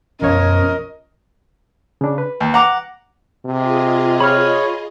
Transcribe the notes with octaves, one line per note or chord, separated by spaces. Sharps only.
B1 F#2 F3 A#4 C#5 D#5
C#3 D4
B4
D#2
F#5 A#5 D6
C3 F4 G#4 D#5
C#5 B5 F6